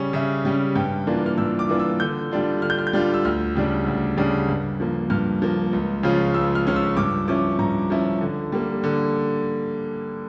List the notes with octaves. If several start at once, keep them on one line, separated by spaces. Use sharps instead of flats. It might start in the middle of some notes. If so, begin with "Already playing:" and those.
Already playing: C#3 G3 C#4
C#3 E5
G3 C#4
G2 G5
E3 A#3 D4 F4
F6
G2 E6
D6
E3 A#3 D4 F4
E6
D3 G6
G3 D4 F4
D3 F6
G6
F6
G6
G3 D4 F4 F6
E6
D2 F6
C#3 G3 D4
D2
C#3 G3 D4
G2
F3 A#3
G2 F6
F3 A#3
C#2
C#3 F3 C#4 F4
C#2 E6
F6
C#3 F3 C#4 F4 F6
E6
G2 D6
F3 C#4 E4 D6
G2 A#5
F3 C#4 E4
D3
G3 A#3
D3